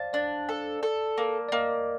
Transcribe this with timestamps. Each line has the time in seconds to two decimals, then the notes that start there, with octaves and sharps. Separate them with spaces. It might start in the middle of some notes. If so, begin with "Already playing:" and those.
Already playing: C5 D5 F5 A5
0.13 D4 D5
0.49 A4
0.83 A4
1.18 A#3
1.49 D5
1.52 A#3 D#5